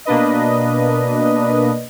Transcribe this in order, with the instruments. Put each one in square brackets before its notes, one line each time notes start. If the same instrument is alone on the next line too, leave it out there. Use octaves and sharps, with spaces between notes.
[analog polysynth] B2 A#3 D4 B4 D#5